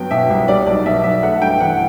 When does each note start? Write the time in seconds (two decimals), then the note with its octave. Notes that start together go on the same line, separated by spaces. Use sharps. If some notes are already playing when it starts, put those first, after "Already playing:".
Already playing: G2 F#3 B3 G5
0.11 B2 E5
0.30 C2
0.48 G3 D5
0.66 B1 D5
0.86 B2 E5
1.04 B1 E5
1.23 A3 F#5
1.41 G2 G5
1.60 E3 F#5